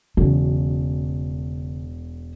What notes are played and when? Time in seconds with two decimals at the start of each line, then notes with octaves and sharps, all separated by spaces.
0.17 E1 C#3 F#3